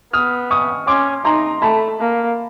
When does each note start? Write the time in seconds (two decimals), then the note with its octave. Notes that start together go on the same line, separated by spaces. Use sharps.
0.13 B3 D#6 F6
0.51 C#6 D#6
0.87 C#4 C6 D6
1.25 D#4 A#5 C6
1.62 A3 A5 B5
2.00 A#3